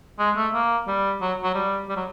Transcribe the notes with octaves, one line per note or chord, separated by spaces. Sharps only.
G#3
A3
A#3
G3
F#3
F#3
G3
G3
F#3